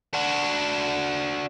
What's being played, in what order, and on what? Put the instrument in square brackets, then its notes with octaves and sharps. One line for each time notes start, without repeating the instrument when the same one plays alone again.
[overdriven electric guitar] D4 F#4